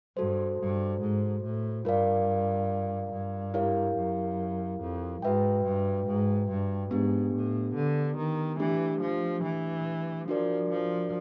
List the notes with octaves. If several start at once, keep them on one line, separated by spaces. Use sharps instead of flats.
G2 F#4 A4 C5
G2
G#2
A2
G2 F4 A#4 D5 F5
G2
E4 G4 A#4 C#5 F5
F#2
F2
G#2 F#4 B4 E5 G5
G2
G#2
G2
G#2 B3 D4 G4
A2
D3
D#3
E3 A3 D4 G4
F3
E3
F3 D4 F#4 A#4 D5
F3